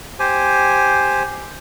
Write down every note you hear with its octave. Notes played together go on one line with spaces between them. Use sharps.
G4 C5 G#5